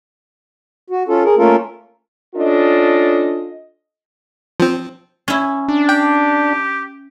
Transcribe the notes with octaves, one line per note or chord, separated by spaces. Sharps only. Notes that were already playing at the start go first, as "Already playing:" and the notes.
F#4
C#4 F4 A4
G#4 A#4
A3 A#3 C#4 F4 A4 A#4
C#4 D4 F4 A4 D#5
F3 C4
C#4 E4
D4
G4 G5